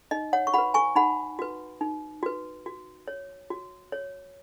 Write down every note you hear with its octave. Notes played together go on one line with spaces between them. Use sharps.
D#4 D#5
C#5 F#5
C#6
F#4 B4 F#5 B5
G#5 C#6
D#4 F#5 B5
F#4 B4
D#4
F#4 B4
F#4
C#5
F#4
C#5